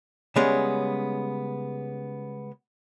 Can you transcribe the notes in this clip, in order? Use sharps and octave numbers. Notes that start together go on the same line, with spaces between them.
C#3 G3 G#3 B3 C#4